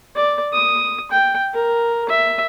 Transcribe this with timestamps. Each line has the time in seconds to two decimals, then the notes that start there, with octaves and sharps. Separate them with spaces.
0.16 D5
0.53 D#6
1.11 G5
1.54 A#4
2.09 E5